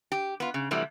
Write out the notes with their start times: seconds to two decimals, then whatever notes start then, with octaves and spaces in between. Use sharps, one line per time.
0.12 G4
0.40 B3 F4
0.54 C#3
0.71 C3 E3 F#3 G3 A3